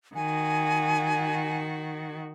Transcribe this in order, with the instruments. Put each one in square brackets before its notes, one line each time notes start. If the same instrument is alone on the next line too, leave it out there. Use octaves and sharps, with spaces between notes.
[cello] D#3 F#4 [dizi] G#5